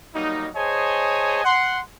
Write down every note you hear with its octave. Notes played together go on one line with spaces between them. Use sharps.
F#3 G3 A#3 D#4
G#4 C5 C#5 D#5 G#5 A5
F#5 C6